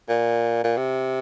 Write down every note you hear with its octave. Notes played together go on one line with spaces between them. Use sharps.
A#2
A#2
C3